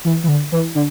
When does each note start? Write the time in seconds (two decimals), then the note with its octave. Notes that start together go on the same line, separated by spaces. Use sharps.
0.05 E3
0.24 E3
0.28 D3
0.52 E3
0.75 D3